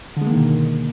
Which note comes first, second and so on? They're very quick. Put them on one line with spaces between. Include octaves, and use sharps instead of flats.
D3 G#3 A#3 D#3 B2